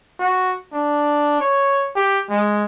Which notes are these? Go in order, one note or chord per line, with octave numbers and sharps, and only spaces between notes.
F#4
D4
C#5
G4
G#3